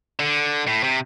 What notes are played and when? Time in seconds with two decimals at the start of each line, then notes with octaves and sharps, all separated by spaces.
0.20 D3
0.67 A2
0.83 C3